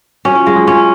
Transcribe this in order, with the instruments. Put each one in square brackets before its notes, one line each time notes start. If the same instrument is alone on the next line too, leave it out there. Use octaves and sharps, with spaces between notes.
[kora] C#4 [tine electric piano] F#4
[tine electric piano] F4
[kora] G#3 [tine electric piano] F4
[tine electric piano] F#3
[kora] C#4 [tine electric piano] F4